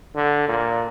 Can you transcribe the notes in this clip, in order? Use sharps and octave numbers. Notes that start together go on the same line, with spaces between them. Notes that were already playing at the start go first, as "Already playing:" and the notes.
D3
A#2